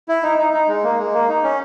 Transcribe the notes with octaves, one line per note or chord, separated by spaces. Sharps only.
E4
D#4
D#4
D#4
G#3
A#3
G#3
A#3
D#4
C#4